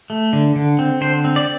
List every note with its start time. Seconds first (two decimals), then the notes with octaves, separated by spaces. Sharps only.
0.10 A3
0.33 D3
0.56 D3
0.79 C4
1.01 D3 C5
1.25 C4
1.36 D5